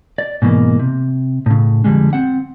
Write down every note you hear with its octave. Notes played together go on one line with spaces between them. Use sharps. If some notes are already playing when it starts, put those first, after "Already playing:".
D5
G#2 B2 E3 A3 A#3
C3
A2 C#3
F2 A#2 D3 G3 G#3
C4 F#5